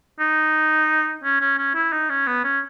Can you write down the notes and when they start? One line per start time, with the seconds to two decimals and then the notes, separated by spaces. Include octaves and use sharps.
0.20 D#4
1.24 C#4
1.41 C#4
1.58 C#4
1.75 E4
1.92 D#4
2.10 C#4
2.27 B3
2.44 C#4